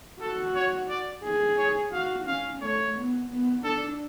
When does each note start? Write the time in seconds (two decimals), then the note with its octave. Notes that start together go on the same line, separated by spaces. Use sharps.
0.21 F#4 A4
0.55 C#5
0.89 D5
1.24 G#4
1.58 C#5
1.92 F#4 F5
2.26 C#4 F5
2.61 A3 C#5
2.95 B3
3.30 B3
3.64 D4 A4